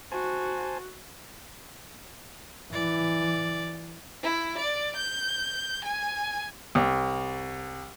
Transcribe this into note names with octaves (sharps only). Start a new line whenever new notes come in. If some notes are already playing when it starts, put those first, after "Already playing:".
F#4 C5 G#5 A5
E3 D5
E4
D5
G6
G#5
C2